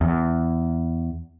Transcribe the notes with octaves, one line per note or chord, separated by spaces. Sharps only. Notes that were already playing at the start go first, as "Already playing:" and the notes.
E2